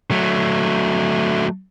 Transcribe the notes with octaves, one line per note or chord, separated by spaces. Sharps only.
F#3 A3